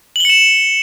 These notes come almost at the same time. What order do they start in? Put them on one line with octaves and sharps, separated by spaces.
F#7 G7 C#7 E7